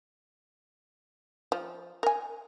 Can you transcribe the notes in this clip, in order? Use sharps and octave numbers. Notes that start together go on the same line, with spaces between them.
F3
A#4 G#5